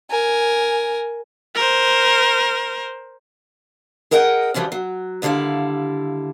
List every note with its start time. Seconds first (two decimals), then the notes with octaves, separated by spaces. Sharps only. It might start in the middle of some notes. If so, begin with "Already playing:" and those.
0.11 A#4 G#5
1.55 A#4 C5
4.11 G#4 A#4 D#5 F#5 G5
4.54 F#2 C#3 E3 F3 G3
4.72 F#3
5.22 D#2 D3 G3 E4 F5